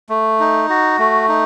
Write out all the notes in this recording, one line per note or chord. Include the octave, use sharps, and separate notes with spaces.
A3
D#4
F#4
A3
D#4